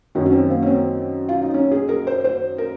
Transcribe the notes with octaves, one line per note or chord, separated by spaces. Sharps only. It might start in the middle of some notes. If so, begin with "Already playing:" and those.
F#2 D#3 F#3 C#4
C#4
C4
A#3
C#4
C4
F4
D#4
C#4
G#4
A#4
C5
C5
A#4